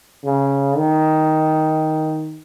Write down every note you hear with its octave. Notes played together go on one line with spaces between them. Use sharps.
C#3
D#3